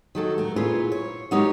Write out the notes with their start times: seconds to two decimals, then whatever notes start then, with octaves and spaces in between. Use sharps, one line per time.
0.15 D#3 F#3 A4
0.38 A3 A#4
0.56 A#2 E4 F4 G#4 B4 C#5
0.92 C#5
1.31 F#3 G#3 D#4 G4 A#4 C#5